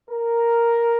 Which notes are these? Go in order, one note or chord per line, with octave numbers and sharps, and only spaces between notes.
A#4